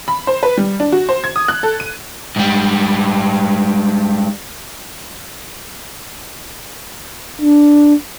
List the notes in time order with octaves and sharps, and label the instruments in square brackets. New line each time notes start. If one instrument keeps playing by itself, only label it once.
[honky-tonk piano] B5
C5
B4
G3
D4
F#4
C5
G#6
D#6
F#6
A4
D#7
[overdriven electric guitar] G#2 G3
[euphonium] D4